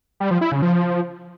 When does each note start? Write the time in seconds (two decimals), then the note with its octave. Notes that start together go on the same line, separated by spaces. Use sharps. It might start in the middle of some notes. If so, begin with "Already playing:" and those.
0.20 G3
0.31 F3
0.41 E4
0.52 C#3
0.62 F3